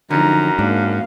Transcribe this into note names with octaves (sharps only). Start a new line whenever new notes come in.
F#2 D3 F3 D#4 A#5
G#2 A#3 D4 F5